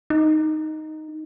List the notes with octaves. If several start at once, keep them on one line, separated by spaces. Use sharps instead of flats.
D#4